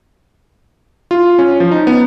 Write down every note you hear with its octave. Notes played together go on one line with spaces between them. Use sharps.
F4
C#4
F3
D#4
B3